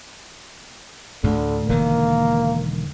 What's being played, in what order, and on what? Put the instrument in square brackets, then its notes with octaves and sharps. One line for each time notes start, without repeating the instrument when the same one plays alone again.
[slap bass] D2 A2 [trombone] D3
[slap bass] E1 D3 D#3 [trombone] A#3